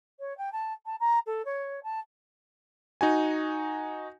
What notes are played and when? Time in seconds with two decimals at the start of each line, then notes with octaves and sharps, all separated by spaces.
0.20 C#5
0.37 G5
0.52 A5
0.86 A5
1.00 A#5
1.26 A4
1.45 C#5
1.83 A5
3.01 D#4 F#4 G#5